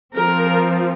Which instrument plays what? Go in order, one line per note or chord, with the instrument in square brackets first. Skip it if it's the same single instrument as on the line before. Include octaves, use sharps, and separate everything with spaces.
[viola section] F3 C4 A#4